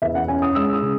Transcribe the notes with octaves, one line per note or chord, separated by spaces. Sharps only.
E2 E5
F#5
C#4 G#5
D#6
G#3 E6
D#6
C#3